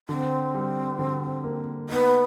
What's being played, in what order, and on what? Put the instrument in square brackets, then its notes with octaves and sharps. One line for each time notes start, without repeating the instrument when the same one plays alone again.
[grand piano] D3 [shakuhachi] C4
[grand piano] G3
D3
A#3
[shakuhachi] B3 [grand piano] D#4